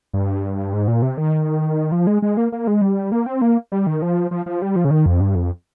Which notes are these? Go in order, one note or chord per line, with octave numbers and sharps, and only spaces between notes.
G2
G#2
A#2
C3
D#3
F3
G#3
G#3
A#3
A#3
G#3
G3
A#3
C4
A#3
G3
D#3
F3
F3
F3
G3
F3
C#3
D#3
F2
G2
F2